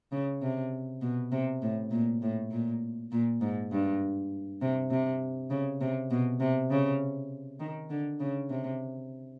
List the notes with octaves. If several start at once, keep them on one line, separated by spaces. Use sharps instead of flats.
C#3
C3
B2
C3
A2
A#2
A2
A#2
A#2
G#2
G2
C3
C3
C#3
C3
B2
C3
C#3
D#3
D3
C#3
C3